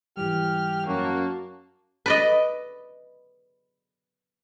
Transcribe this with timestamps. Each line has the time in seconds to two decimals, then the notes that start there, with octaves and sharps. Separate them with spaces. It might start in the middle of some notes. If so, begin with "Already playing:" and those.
0.17 G#2 E3 G3 G4 F6
0.87 F#2 A#3 F#4 A5
2.06 B4 D5 D#5